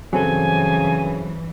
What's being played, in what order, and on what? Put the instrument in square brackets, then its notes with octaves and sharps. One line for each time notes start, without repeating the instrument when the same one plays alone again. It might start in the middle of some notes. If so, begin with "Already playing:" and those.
[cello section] G2 E3 [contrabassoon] C#3 [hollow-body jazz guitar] F#3 C4 A4 [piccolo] G#5